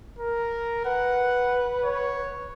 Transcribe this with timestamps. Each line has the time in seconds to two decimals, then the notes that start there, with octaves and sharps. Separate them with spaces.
0.19 A#4
0.85 B4 F#5
1.84 C#5